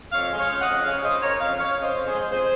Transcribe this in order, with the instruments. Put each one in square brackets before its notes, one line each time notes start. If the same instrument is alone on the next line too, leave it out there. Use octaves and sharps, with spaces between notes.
[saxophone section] F2 C#5 F5
G#3
C#5 F5
C#3
D#5 F#5
F2
C#3 C#5 F5
C#3 C5 D#5
C#3 A#4 C#5
F2 C#5 F5
C#3 C#5 F5
C#3
C5 D#5
F2
G#4 C5
G#3
F2 G#4 C5